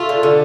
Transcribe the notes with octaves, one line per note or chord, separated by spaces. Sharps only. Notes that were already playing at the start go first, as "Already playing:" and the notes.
Already playing: A3 F4
D3
D3